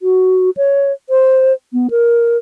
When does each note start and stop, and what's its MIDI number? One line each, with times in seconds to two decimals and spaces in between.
0.01 0.50 66
0.57 0.92 73
1.10 1.53 72
1.73 1.88 59
1.90 2.37 70